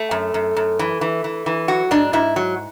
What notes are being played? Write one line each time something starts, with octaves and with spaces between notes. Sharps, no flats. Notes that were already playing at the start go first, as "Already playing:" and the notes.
Already playing: A3
F#2
F#2
F#2
E3
E3
E3
E3
F#3 F#4
G#2 D4
G#2 E4
F#3